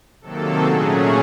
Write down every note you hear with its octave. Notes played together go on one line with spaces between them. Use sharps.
C3 D#3 F#3 A#3 A4
A#2 F#3 A3 C#4 G#4